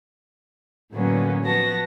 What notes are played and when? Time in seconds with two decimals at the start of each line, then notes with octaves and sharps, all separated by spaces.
0.92 A2 D3 F#3 A#3 B3 C#4
1.43 F3 B3 F#4 A5 A#6